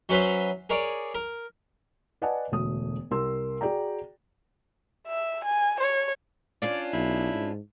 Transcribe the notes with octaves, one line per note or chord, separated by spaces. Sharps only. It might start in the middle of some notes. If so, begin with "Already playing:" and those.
F#3 C#4 B4 C5 E5
G#4 A#4 C#5 D5
A#4
B4 D5 D#5 F#5 G#5 A5
E1 D2 A3 D#6
C2 A#4 C6 E6
F#4 G#4 D5 G5 A#5
E5
G#5
C#5
C#4 D4 F4 D5
B1 E4
G#2